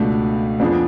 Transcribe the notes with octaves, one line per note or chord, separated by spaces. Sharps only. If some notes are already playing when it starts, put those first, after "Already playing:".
Already playing: C#2 B2 A3 D4
F2 F3 B3 D4 G#4